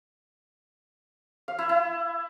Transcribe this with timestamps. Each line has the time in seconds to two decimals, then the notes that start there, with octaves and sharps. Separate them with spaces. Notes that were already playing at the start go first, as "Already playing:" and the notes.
1.48 F5
1.59 E4
1.69 E4